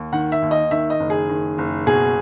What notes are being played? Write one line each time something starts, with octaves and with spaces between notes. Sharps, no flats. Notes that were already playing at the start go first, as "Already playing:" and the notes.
Already playing: D#2
D#3 F#5
E5
D#2
D#5
D#3 E5
D#5
F#1
G#4
D#3
F#1
B2 G#4